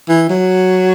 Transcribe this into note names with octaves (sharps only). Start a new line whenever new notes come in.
E3
F#3